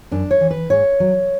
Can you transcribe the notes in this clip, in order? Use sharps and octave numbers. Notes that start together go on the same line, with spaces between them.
F#2 D4
C#5
E3
B4
G#2 C#5
F#3